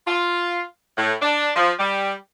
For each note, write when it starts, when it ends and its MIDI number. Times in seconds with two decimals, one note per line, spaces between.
0.07 0.61 65
0.97 1.13 45
1.21 1.50 62
1.55 1.71 53
1.79 2.12 55